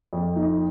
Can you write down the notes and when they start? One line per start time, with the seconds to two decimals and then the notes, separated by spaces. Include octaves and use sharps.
0.13 F2
0.36 D#4